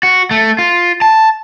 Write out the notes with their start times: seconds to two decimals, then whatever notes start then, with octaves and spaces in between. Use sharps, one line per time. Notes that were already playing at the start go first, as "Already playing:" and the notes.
0.03 F#4
0.31 A3
0.59 F4
1.02 A5